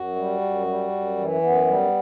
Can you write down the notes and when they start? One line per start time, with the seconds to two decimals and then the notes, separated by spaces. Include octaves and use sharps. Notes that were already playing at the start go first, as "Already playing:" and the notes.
Already playing: F#2 F#4
0.16 G3
0.41 F#2
0.67 G3
0.92 F#2
1.17 E3
1.41 F#2 B3
1.67 G3